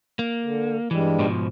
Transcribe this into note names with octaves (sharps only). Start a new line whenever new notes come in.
A#3
D3
G2 E3 G3 G#3
G#2 B2 F3